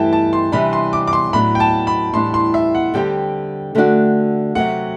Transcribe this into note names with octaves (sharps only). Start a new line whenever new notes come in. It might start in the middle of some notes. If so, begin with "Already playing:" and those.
Already playing: G2 E3 A3 E4 G4 G5 A5
A5
C6
C3 E3 G3 D4 B5
C6
D6
D6
C6
A2 F#3 B3 D4 B5
G5
A5
B5
A2 E3 G3 D4 C6
C6
E5
F#5
D3 G3 C4 G4 G5
D3 A3 D4 F#4
C3 F#3 A3 C4 F#5